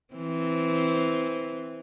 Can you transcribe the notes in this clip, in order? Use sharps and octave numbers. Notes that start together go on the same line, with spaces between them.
E3 C4